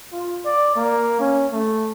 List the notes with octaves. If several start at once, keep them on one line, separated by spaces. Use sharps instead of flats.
F4
D5
A#3
C#4
A3